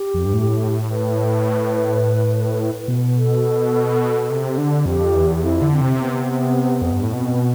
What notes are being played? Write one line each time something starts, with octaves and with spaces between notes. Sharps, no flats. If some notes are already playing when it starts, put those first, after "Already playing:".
Already playing: G4
F2
G2
A2
B4
B2
A4
C3
D3
F2 G4
E2
F2 E4
D3
C4
C3
B3
F2
G2
A2
B2 C4